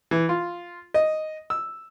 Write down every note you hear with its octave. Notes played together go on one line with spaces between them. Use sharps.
E3
F4
D#5
E6